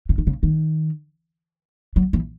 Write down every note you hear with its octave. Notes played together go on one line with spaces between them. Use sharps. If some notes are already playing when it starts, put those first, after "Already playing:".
C3
D#3
C#3
D#3
F#3
E3